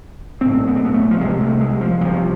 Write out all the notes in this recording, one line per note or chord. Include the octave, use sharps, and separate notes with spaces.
B1 A2 C4
B3
C4
B3
A3
F3
C2 C3 G#3
A3
G#3
F3
C2 C3 F3